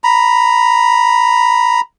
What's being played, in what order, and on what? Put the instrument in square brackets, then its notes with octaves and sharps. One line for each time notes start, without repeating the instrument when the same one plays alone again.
[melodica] A#5 B5